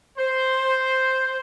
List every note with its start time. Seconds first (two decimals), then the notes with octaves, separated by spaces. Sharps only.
0.18 C5